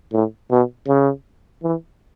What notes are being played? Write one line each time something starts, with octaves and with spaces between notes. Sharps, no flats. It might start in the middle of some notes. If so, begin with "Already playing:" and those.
A2
B2
C#3
E3